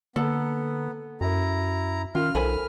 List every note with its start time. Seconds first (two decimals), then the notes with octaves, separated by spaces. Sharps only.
0.16 D3 A#3 B3 A4 A#5
1.21 F#2 E4 F#4 A#5
2.15 D#3 C#4 F4 F6
2.35 B1 A4 A#4 C5 G#5 B5